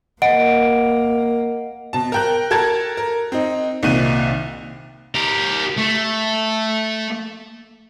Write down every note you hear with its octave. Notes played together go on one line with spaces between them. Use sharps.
A#3 D#5 F#5 D7
B2 A5
A#4 G5 F#6
A4 A#4 A5 G#6 A6
A#4
C4 D#4
C2 A#2 D#3 F#6 D#7
G4 A#4
A3